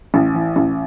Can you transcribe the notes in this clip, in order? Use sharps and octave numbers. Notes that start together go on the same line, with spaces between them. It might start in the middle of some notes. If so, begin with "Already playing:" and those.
A1
E3
A1